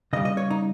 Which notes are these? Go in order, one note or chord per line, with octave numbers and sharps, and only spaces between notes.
C#3 G3 D#5
D#5
C#5
D#4